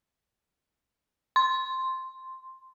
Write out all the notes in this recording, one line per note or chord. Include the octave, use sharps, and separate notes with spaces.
C6